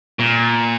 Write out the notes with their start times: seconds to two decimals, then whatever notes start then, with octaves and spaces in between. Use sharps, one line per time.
0.19 A#2